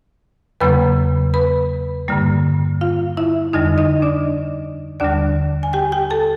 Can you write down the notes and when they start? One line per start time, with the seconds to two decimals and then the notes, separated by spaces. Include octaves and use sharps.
0.61 E2 C#3 F#3 A#3 B4 B5
1.34 B4 B5
2.08 G2 D3 G3 A#3
2.81 F4 F5
3.17 E4 E5
3.53 F2 D3 G3 D#4 D#5
3.78 D#4 D#5
4.02 D4 D5
5.00 D#2 D3 G3 D4 D5
5.63 G#5
5.73 G4 G5
5.92 G4 G5
6.10 A4 A5